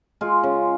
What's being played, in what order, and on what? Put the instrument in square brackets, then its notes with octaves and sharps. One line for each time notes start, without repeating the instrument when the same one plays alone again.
[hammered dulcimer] G#3 F4
C#3